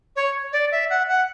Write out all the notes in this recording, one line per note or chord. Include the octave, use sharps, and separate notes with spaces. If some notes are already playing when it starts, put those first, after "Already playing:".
C#5
D5
E5
F#5
F#5